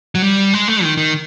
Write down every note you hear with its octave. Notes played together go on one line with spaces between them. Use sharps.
F#3
G3
G#3
A3
D#3
D#3